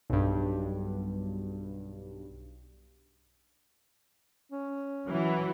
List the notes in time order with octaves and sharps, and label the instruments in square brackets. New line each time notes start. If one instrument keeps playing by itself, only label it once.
[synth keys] B1 G2
[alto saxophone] C#4
[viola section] E3 [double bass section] F#3